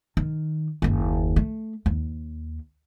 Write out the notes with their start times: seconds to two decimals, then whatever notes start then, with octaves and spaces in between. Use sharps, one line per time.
0.17 D#3
0.82 F#1 D#2
1.36 A3
1.86 D#2